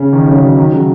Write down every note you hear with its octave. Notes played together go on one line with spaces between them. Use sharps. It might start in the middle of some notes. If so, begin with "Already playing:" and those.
Already playing: C#3
D#3
C#3 F#3
D#3
D#3
C#3 F#3